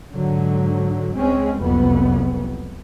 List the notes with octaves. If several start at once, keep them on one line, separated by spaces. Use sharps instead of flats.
G#2 D3 F#3
C#2 G#3 C4 C#4
F#1 C2 F2 B3